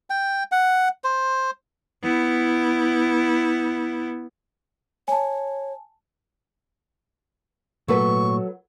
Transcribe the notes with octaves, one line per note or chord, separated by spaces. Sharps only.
G5
F#5
C5
B3 E4
C#5 G#5 A5
A#2 F#3 A3 A#3 A4 B4 C#6